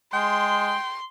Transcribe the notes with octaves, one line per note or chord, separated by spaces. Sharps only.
G#3 G5 C6